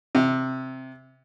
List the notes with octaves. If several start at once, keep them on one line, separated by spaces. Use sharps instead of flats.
C3